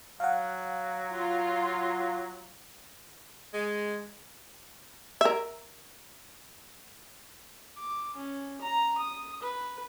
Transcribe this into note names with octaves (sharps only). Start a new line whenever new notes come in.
F#3 F5 F#5
F4
G#3
A#4 E5
D6
C#4
A#5
D#6
B4